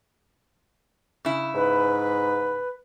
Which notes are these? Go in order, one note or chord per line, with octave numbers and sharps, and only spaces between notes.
C#3 E4
G#2 B4